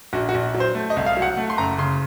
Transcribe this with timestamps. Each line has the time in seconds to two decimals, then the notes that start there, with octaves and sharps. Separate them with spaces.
0.13 A#1 F#4
0.29 F#4
0.34 A#1
0.54 F#3
0.60 C5
0.75 A3
0.90 D#5
0.96 C2
1.06 F5
1.17 F#3
1.22 F#5
1.37 A3
1.50 C6
1.58 F#1 A#5
1.78 C#3 C6